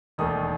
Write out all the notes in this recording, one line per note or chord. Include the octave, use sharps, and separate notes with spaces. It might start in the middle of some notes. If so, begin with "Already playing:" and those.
E1 D#2 D#3 A3 D#6